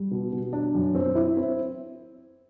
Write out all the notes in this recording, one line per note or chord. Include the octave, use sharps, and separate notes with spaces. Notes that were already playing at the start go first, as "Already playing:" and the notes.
Already playing: G3
B2
B2
D4
F#2
C4
E4
C4